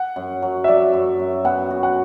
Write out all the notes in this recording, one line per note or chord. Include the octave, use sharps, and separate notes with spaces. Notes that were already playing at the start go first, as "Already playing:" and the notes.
Already playing: F#5
F#2
F#3
E5
F#3 D5
F#2
F#2
B3 F#5
F#4
F#5